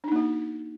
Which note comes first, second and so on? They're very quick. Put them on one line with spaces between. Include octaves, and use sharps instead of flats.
D4 D#4 A#3 F#4